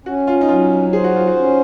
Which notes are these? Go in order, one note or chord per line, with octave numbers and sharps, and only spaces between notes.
C#4 F#4
F4
D#4
F#3 F4
G#4 C5
F#4
F4
F#4
C#4